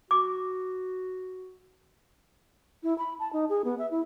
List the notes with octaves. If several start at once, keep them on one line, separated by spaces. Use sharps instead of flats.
F#4 D6
E4
B5
A5
D#4
G#4
B3
E5
E4